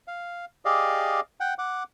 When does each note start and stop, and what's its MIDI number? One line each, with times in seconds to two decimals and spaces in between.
0.08 0.45 77
0.65 1.20 67
0.65 1.20 68
0.65 1.20 74
0.65 1.20 75
0.65 1.20 77
1.40 1.54 78
1.40 1.54 79
1.58 1.83 78
1.58 1.83 86